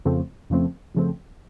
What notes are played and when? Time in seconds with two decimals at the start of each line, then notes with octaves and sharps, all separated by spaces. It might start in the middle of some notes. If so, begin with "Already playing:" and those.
0.05 F2 C#3 F3 A3 C4
0.50 F2 C#3 F3 A3 C4
0.95 F2 C#3 F3 A3 C4